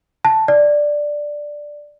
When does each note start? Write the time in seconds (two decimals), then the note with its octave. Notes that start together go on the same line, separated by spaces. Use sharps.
0.25 A5
0.48 D5